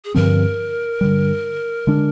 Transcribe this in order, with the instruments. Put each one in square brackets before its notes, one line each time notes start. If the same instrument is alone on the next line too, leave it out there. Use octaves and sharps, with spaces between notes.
[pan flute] G#4
[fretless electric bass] G2 D3 F3 C4 [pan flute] A#4
[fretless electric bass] G2 D3 G3
D3 G#3 D4